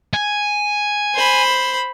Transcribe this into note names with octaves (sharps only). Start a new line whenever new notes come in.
G#5
C5 B5